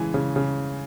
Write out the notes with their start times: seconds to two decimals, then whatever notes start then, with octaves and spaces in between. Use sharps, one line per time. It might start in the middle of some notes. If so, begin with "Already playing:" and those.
Already playing: C#3 E3 G#3 G#5
0.14 C#3
0.36 C#3